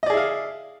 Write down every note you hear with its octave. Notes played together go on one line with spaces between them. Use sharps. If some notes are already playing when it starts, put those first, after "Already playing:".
E4 G#4 D5 D#5 F5